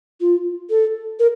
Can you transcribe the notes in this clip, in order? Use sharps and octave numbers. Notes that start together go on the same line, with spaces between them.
F4
A4
A#4